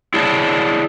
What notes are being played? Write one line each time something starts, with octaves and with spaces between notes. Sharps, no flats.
E4 G#4 C#5 D5 A5